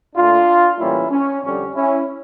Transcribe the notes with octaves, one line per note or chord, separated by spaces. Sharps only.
A#2 A3 D4 F4
A2 E3 G3 A#3 C#4 E4
C#4
F2 D3 G3 C#4
C#4 E4